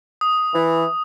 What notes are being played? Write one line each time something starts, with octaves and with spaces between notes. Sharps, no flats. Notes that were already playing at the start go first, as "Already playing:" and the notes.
D#6
E3